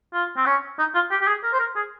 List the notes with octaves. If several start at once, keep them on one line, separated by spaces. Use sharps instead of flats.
F4
C4
C#4
D#4
F4
G4
G4
G#4
A#4
C5
A#4
G#4